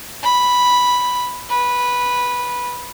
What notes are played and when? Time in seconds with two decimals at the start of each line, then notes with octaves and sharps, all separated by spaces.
0.23 B5
1.50 B4